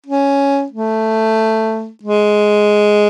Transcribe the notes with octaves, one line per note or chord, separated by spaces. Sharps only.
C#4
A3
G#3